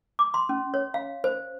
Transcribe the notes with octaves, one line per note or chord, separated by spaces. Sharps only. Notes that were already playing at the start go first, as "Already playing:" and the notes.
D6
C6
C#4
C#5
F5
C5